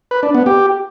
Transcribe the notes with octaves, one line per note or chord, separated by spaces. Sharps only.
B4
D4
B3
G4